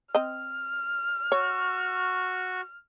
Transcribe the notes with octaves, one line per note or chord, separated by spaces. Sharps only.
C4 D#5 F6
F#4 C#5 C#6